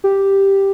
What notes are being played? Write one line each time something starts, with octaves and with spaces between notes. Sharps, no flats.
G4